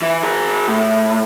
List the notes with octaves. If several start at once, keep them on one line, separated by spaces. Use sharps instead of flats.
E3
G#4 A#4
A2